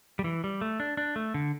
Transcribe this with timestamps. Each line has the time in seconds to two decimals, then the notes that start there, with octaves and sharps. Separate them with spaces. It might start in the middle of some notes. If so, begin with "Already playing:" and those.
0.19 G3
0.24 E3
0.44 G3
0.61 A3
0.80 D4
0.97 D4
1.16 A3
1.34 D3